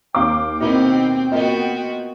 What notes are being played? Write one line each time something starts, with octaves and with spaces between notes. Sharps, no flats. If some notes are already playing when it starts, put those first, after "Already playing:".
D#2 F5 G5 D6
B2 C4 D#4 E4 A#4
A#3 B3 F4 F#4 D#5